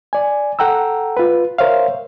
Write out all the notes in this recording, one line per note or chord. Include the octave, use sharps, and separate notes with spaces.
D5 G#5
A4 F#5 G5 A#5 E6
F4 B4
A#4 C5 C#5 E5 F5